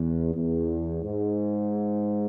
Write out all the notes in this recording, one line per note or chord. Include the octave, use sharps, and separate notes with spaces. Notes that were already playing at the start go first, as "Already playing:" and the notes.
Already playing: E2
E2
G#2